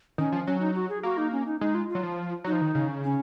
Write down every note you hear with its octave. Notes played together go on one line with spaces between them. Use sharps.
D#3 C#4
F3
F#3 C#4
D#4
F#4
G#4
A#3 F#4
D#4
C#4
D#4
G#3 D#4
F4
F4
F#3
F3
F#3 D#4
F3
D#3
C#3
C#4